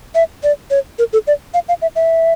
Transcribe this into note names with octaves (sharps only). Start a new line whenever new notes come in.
E5
D5
C#5
A#4
A4
D5
F5
F5
E5
E5